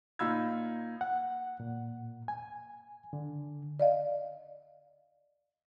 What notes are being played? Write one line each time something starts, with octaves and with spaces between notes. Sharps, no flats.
A#2 D#4 F4 B5 E6 G#6
F#5
A#2
G#5
D3
D5 D#5 F5